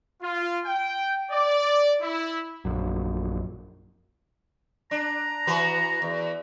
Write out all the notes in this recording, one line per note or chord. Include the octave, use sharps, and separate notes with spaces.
F4
G5
D5
E4
A#1 F#2
D4 A#5
E3 F#4 B4
E2